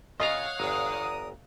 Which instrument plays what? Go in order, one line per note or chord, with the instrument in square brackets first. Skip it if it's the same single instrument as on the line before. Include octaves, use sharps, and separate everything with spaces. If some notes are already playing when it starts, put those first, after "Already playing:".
[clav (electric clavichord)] C#3 F4 A#5 [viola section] C#5 F5 F#5 [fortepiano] D#5
[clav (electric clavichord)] G1 E2 [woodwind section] D5 A#5 D#6